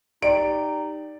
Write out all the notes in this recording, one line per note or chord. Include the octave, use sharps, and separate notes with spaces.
D#4 G4 D5 G5 D7